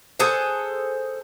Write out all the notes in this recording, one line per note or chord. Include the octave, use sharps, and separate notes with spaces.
G#4 A4 C5 F#5